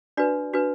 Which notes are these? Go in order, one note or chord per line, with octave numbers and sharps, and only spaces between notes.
D4 F#4 B4 D5
D4 F#4 B4